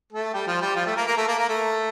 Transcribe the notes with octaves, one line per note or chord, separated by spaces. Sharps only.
A3 A4
G3 G4
F3 F4
G3 G4
F3 F4
A3 A4
A#3 A#4
A#3 A#4
A3 A4
A#3 A#4
A#3 A#4
A3 A4